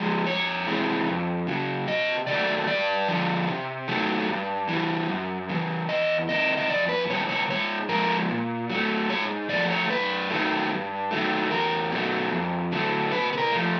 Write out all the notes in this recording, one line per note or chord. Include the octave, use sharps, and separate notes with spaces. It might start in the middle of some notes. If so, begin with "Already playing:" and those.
Already playing: F3 G#3
F2 C#5
C3 E3 G#3
F2
C#3 F#3
C3 D#5
D#3 F#3 A3 D5
G2 D5
D3 F3
C3
D#3 F#3 A3
G2
E3
G3
F#2
C#3 E3
E2 D#5
C3 D#3 D#5
D#5
F2 D5
B4
C3 D#3 G3 C#5
C#5
G#2 C#5
F3 G#3 A#4
A#2
F#3 A3
G#2 C#5
F3 A3 D5
C#5
F#2 B4
D#3 F#3 A3
G2
D#3 F#3 A3
E2 A#4
B2 F#3 A3
F2
D3 F#3 A3
C3 B4
B4
A#4
F3 A3